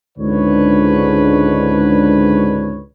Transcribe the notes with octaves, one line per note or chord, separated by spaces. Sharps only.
C#2 G#2 D3 D4 B4 C#5